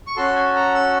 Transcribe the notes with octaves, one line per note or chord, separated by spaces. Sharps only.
C#6
C#4 F#4 A4 C6
G#5
A#5
E6